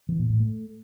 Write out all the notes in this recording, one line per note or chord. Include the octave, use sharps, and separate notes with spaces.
E3
A#2
A2
A3